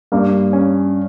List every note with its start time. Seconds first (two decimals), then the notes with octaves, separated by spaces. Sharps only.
0.12 G2 A#3
0.53 C#4